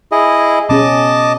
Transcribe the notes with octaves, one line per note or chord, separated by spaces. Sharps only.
E4 G#4 D#5
B2 C#4 G#4 D#5 A5 D6